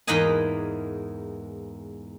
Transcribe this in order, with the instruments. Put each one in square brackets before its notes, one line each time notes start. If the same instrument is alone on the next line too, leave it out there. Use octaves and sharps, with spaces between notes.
[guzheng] E2 G#2 A#3 B4 D#5 G#5